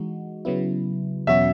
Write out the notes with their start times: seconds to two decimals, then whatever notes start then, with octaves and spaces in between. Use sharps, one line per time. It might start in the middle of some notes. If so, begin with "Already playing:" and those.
Already playing: E3 G#3 D#4 F#4
0.45 C#3 F#3 B3 E4
1.27 E2 B2 F#3 C#4 F#4 E5